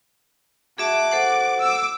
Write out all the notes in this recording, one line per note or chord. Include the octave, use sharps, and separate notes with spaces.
F#4 G#4 E5 A5 D6
A4 C5 F#5
D6 E6